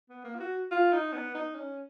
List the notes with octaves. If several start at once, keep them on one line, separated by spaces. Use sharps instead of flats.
B3
A#3
F4
F#4
F4
D#4
B3
D#4
C#4